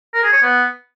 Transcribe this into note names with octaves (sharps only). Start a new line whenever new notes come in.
A#4
G#4
C#5
B3